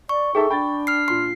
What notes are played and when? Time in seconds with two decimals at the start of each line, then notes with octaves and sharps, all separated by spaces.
0.09 D5 C#6
0.35 D#4 G#4 A4 E5 G5
0.50 D4 G5 B5 A6
0.87 F6 C7
1.08 A#2 C6 C7